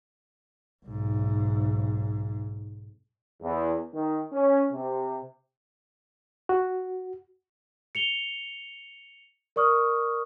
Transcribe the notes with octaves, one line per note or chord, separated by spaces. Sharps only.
B1 G#2
E2
D#3
C#4
C3
F#4
C#7 F7 G7
A#4 D5 C#6 D#6 F6